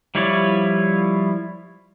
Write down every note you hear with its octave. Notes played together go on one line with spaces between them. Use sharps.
F3 G3 E4 C#5 D5